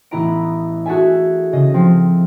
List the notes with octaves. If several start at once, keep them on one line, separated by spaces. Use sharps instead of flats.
A1 B3 E4 D#5 A#5 D7
F#4 G#4 A4 E5 G#5
C#3 D#5
F3 C4